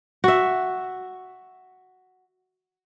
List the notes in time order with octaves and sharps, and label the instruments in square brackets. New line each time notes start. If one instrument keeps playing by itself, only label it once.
[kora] F#4 E5